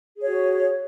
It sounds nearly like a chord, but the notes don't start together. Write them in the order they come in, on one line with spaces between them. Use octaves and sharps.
G#4 C#5 F#4